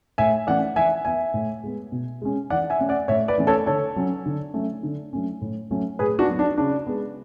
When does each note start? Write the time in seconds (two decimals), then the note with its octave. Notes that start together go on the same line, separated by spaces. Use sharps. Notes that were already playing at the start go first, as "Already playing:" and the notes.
0.18 A2 E5 G#5
0.47 E3 A3 C#4 D5 F#5
0.76 E3 E5 G#5
1.05 B3 E5 G#5
1.34 A2
1.64 G#3 B3
1.92 B2
2.22 G#3 C#4
2.50 E3 D5 F#5
2.70 E5 G#5
2.80 A3 C#4
2.89 D5 F#5
3.08 A2 C#5 E5
3.28 B4 D5
3.38 E3 A3 C#4
3.47 A4 C#5
3.66 D3 A4 C#5
3.96 F#3 C#4
4.26 D3
4.54 F#3 A3 C#4
4.83 D3
5.13 F#3 A3 C#4
5.41 A2
5.71 F#3 A3 C#4
5.99 A2 G#4 B4
6.19 D4 F#4
6.28 F#3 B3
6.39 D4
6.58 C#3 D4
6.87 G#3 B3